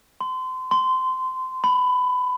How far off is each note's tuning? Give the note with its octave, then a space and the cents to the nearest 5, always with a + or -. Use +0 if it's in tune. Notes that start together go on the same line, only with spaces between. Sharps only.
C6 -30
C6 -20
B5 +20